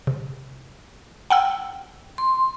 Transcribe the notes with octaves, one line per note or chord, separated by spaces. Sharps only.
C3
F#5 G5 E6
C6